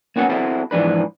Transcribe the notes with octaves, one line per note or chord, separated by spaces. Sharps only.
A#3 B3 C#4 F#4 F#5
C4 E4 F#4 A4
G#2 E3 F3 D4 B4